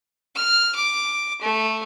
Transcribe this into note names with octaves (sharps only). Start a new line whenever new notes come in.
F6
D6
A3